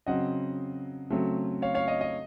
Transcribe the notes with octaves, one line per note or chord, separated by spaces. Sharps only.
C#3 F#3 C4 D#5 F#5
C#3 F#3 A3 C4
C#5 F5
C#5 F5
D#5
D#5